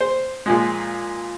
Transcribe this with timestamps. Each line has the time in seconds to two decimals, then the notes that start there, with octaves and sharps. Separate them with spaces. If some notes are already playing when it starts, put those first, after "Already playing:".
0.01 C5
0.46 A#2 F3 G#3